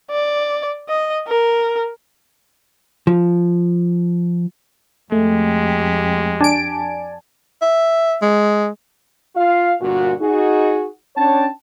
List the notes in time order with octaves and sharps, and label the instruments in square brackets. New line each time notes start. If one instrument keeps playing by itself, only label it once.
[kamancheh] D5
D#5
A#4
[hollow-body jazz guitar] F3
[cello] F2 G4 [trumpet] G#3 [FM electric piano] A3
[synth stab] D4 D7 [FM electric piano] D5 G#5 A5
[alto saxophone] E5
G#3
[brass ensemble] F4 F5
G1 A#2 F#4
D#4 F#4 G#4
C#4 D4 C#5 G5 A5